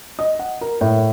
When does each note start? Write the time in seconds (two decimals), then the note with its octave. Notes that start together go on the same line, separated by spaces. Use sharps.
0.19 D#5
0.39 F#5
0.61 A#4
0.81 A2